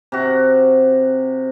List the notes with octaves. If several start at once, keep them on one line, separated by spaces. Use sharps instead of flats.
C3 F#4